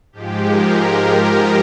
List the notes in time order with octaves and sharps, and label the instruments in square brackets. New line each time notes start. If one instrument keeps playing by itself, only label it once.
[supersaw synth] G#2 F3 G#3 G4
A#4